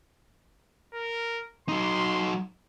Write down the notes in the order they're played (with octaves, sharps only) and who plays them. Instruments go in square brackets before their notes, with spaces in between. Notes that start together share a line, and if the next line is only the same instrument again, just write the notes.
[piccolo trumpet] A#4
[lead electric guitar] F#3 D#4 [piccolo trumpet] C6